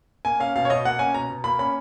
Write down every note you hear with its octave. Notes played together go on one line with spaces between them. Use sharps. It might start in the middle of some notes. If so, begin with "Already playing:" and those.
A#3 G#5
C#4 F5
B2 F5
C#5
B2 D#5
A#3 F#5
C#4 G#5
B2 A#5
B2
A#3 B5
C#4 B5